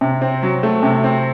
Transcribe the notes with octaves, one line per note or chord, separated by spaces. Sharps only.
C3
C4
F#3
A3
C3
C4